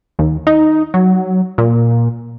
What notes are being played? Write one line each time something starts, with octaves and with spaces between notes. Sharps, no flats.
D#2
D#4
F#3
A#2